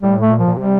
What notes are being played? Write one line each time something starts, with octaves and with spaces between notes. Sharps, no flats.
A2 G3
A3
A#2
F3
A#2
C3 G3